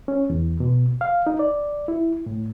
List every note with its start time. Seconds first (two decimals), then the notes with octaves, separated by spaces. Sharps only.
0.08 C#4
0.30 E2
0.60 B2
1.01 F5
1.27 D#4
1.39 D5
1.88 E4
2.26 A2